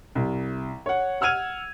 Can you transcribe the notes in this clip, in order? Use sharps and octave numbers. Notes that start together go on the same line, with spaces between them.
C2
C#5 F#5
F#5 E6 F6 G#6 D#7 F7